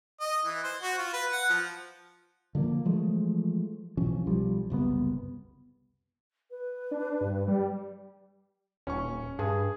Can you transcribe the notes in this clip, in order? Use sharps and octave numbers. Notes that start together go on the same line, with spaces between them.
D#5
E3
C5
F#4
F4
B4
F#5
F3
D3 F3 A3 A#3
E3 F3 G#3 A3
B1 E3 F3 C#4
B1 F3 G3
F#1 C2 A2 B3
B4
D4
G2
G3
D#1 C#4 C#6
G2 G#4